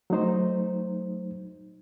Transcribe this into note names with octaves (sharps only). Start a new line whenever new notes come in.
F#3 A3 D#4 C5